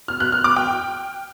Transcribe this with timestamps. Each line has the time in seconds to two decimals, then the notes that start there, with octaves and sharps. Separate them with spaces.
0.08 F6
0.20 F#6
0.32 F6
0.44 D6
0.56 G5